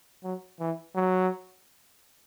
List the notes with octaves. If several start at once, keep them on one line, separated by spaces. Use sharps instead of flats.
F#3
E3
F#3